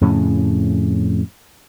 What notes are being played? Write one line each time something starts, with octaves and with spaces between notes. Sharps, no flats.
F2 A2 C#3 C#4